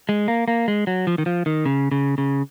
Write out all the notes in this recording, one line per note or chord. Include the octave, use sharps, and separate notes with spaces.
G#3
A#3
A#3
G#3
F#3
F3
D#3
F3
D#3
C#3
C#3
C#3